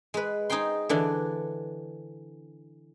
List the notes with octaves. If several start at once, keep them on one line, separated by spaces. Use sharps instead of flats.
G#3 B4
D#4 G#4 C5 G5 C6
D3 E3 D4